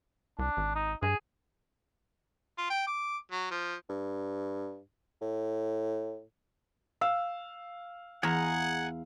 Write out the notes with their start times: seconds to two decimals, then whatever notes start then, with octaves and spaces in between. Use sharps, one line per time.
0.39 C2 D4
0.57 G#1
0.75 D#4
1.02 G2 G#4
2.58 F4
2.70 G5
2.87 D6
3.32 F#3
3.51 F3
3.90 G2
5.22 A2
7.01 F5 E6
8.23 E2 G#4 F#5 A#5